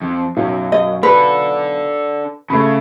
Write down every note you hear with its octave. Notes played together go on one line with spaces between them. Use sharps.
F2
B1 F#2
D#5
D4 A4 B4
C#3 A3 B5